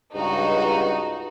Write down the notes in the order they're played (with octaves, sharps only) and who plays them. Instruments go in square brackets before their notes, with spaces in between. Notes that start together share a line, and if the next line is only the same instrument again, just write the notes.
[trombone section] C#2 G2 [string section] D#4 F#4